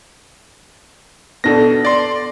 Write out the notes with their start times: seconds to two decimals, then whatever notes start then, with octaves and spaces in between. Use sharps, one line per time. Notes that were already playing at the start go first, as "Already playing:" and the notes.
1.44 B2 B3 D4 A4 A#6
1.85 D5 C6